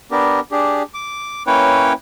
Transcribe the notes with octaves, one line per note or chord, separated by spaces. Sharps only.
B3 D4 G4 A#4
D4 G4 G#4
D6
A#3 C#4 E4 B4 C#5 G5